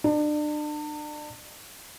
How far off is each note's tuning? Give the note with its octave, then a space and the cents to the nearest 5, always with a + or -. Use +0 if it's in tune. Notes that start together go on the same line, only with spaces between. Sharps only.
D4 +35